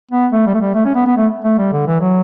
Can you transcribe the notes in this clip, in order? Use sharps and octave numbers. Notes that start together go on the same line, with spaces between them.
B3
A3
G3
A3
G3
A3
C#4
B3
B3
A3
A3
G3
D3
E3
F#3